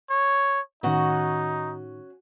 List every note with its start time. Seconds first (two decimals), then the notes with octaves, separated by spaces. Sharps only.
0.10 C#5
0.83 A2 D#3 C#4 D#4 F#4 F#5